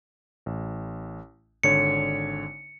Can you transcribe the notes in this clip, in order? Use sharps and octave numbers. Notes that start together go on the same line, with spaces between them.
A1
G#1 D3 C#5 C#7